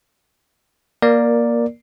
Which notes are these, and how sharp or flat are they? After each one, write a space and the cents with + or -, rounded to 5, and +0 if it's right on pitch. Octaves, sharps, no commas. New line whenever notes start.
A#3 +15 A#4 +0 D5 +0